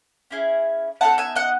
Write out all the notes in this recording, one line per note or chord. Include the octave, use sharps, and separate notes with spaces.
C#4 E4 G#4
B3 D#4 A4 F#5 A5
E5 G#5
D#5 F#5